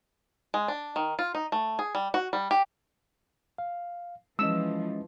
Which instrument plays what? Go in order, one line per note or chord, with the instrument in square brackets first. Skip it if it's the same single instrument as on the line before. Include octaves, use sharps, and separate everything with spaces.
[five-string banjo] G#3
D4
D#3
F4
D#4
A3
G#4
G3
F#4
G3
G4
[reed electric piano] F5
[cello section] E3 F3 [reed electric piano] G#3 C#4 D#5 [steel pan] E6